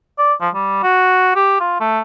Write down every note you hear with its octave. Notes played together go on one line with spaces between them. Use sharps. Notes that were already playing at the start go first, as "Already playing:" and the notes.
D5
F3
G3
F#4
G4
F4
A3